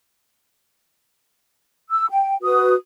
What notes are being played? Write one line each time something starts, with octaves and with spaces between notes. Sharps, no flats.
E6
G5
F#4 B4 D#6